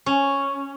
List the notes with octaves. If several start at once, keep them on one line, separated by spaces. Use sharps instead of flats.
C#4